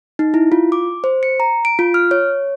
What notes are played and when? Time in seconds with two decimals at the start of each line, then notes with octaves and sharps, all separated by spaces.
0.19 D#4
0.34 E4
0.52 F4
0.72 D6
1.04 C5
1.23 C#7
1.40 A#5
1.65 D7
1.79 F4
1.94 F6
2.11 C#5